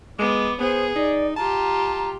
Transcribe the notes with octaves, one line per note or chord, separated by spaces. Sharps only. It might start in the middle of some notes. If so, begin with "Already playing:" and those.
G#3 B3 D6
B3 G#4 C5
D#4 D5
F4 G4 A5 A#5